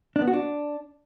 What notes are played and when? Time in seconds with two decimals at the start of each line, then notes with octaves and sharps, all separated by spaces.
0.16 D4
0.22 B3
0.28 F#4
0.33 D4